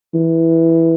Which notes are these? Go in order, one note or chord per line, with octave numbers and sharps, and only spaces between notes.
E3